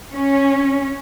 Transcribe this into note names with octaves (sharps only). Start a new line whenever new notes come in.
C#4